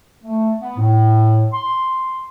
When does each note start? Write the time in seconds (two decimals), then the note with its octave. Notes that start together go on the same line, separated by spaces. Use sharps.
0.24 A3
0.59 B3
0.77 A2
1.53 C6